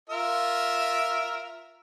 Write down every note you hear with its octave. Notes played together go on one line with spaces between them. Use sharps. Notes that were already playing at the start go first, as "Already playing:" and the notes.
F4 A#4 E5